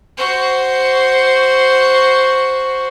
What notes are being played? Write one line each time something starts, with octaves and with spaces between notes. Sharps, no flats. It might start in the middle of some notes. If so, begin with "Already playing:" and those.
F#4 C5